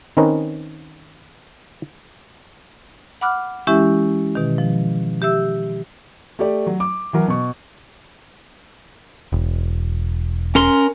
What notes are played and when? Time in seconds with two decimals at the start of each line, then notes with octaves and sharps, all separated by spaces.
0.17 D#3 C4 C#4 D#4 A#4 B4
3.21 F#5 B5 D6 F6 F#6
3.67 E3 G#3 C#4 E4 G4 E5
4.35 B2 D#3
4.58 F3
5.22 G4 E5 E6
6.39 A3 G4 D5
6.67 F#3
6.80 D6
7.13 E3 F#3 A#4
7.28 B2 C#6
9.32 E1
10.55 C#4 A#4 C6